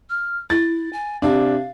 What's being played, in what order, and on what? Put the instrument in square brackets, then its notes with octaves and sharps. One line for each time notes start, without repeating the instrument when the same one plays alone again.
[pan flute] F6
[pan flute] E4 [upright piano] A6
[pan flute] G#5
[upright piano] C3 D4 [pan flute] F5